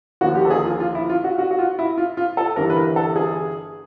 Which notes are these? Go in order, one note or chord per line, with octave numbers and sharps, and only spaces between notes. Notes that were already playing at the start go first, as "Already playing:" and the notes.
D#2 D3 F3 A#3 F#4
G4
A4
G#4
F4
F4
E4
F4
F#4
F#4
F#4
F4
E4
F4
F4
A4
G1 G2 E3 G3 A#4
B4
A#4
A4
G#4